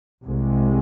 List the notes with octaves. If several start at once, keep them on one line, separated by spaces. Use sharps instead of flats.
C2 C3 G#3